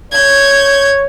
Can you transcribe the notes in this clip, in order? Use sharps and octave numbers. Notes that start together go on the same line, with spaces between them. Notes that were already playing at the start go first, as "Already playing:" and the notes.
C#5 G6 G#6